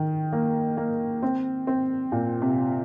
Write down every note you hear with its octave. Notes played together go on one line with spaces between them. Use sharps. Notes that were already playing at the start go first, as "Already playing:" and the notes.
Already playing: D#3
A#3
A#3
C4
C4
A#2
C3